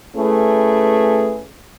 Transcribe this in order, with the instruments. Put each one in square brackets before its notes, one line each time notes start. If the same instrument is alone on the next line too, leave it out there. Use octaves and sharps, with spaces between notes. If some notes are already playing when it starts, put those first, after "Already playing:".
[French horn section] A3 C#4 E4 G#4 B4